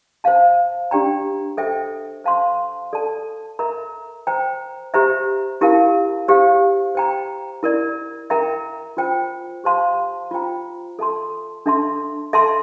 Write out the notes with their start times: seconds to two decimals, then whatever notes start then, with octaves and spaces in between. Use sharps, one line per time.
0.24 C5 F5 A5
0.91 D4 G4 D5 G5 A#5
1.57 A4 C5 E5 G5
2.24 C5 F5 A5 C6
2.93 A4 D5 A5
3.59 A#4 E5 A#5
4.27 C5 G5 A#5
4.94 G4 C5 E5 A#5
5.61 E4 G4 A#4 F5 A5
6.28 G4 C5 F5
6.95 C5 G5 A#5
7.63 E4 A#4 D5
8.30 A#4 E5 G5 A#5
8.97 F4 C5 G5
9.64 G4 C5 F5 A5 C6
10.31 F4 C5 G5 A#5
10.99 A4 E5 A5 C6
11.66 D4 A4 E5 A5 C6
12.33 A4 E5 A5 C6